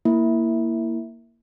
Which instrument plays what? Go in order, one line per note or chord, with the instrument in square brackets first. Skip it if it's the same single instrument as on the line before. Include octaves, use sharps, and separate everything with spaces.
[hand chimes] A#3 E4